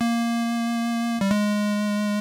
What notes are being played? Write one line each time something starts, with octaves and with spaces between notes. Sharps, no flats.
A#3
G3
G#3